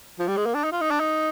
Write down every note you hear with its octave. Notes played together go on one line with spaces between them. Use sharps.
F3
G3
G#3
A#3
D4
D#4
F4
D#4
D4
D#4